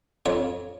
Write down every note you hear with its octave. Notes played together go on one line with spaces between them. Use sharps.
F2 C#5